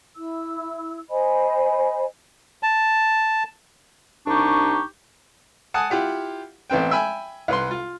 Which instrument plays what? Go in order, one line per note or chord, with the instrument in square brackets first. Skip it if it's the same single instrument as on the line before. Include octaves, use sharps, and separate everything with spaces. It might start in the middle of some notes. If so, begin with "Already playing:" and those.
[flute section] E4 E6
C5 D#5 G#5 B5
[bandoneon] A5
[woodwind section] C2 D4 D#4 G4 C#6
[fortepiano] F#5 G#5 A5 D#6
E4 F4 G4 F#5
A1 B3 C4 G5
E5 G5 G#5 B5
C2 B4 C6
F4